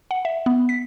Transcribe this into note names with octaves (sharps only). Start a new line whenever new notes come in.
F#5
E5
B3
B6